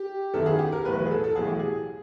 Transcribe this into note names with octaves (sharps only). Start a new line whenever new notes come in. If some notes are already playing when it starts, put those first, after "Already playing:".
Already playing: G4
F#2 D#3 F#3 B3 E4 A4
G#4
G4
A#4
B1 A2 E3 B4
B4
G#4
A4
A4
B1 A2 E3 G#4
G4
G#4